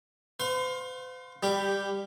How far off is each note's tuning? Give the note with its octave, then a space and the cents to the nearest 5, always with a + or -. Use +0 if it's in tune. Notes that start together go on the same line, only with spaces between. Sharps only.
C5 -45 F5 +30 C6 +30
G3 +15 G4 +0